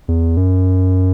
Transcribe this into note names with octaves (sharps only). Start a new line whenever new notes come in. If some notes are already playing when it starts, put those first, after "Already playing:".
E2
F#2